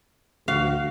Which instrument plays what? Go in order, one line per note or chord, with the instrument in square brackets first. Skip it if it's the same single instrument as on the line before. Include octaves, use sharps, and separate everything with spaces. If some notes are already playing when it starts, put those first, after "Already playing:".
[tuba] D2 [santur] F#4 [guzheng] F5